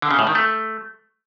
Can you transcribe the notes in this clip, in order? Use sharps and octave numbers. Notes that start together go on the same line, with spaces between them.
D3
C#3
A2
D#3
A3